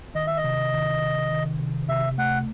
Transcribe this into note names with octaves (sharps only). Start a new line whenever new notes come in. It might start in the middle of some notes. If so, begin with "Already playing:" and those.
D#3 D#5
E5
D#5
C3
D#3
C3
D#3
C3
C3 E5
A3 F#5